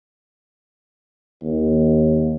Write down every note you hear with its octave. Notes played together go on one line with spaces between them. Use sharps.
D#2